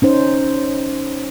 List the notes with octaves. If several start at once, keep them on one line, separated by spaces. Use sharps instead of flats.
C#4 D#4 C5